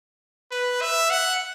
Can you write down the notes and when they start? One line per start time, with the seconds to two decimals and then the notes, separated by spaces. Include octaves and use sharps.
0.52 B4
0.81 E5
1.11 F#5